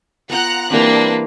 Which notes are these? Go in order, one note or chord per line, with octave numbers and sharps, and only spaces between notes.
B3 F4 F#5 G5 A#5 F#6
E3 G3 A#3 C4 D4 B4